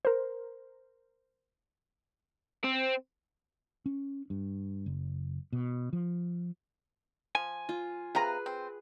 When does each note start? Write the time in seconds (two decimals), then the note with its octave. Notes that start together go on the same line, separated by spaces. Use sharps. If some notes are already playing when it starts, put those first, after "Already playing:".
0.05 A#4 C5
2.64 C4
3.86 C#4
4.30 G2
4.86 F#1
5.53 B2
5.93 F3
7.35 F3 G#5
7.69 F4
8.15 C3 F4 G#4 B4 A#5
8.46 C4